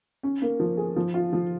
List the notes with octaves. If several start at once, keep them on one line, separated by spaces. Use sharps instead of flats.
C#4
A#3
F3
G#4
F3
F4
F3